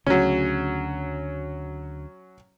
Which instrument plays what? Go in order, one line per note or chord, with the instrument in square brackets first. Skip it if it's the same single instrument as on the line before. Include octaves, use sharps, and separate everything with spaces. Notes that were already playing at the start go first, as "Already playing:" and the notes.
[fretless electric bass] D2 C#3 [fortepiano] F#3 C#4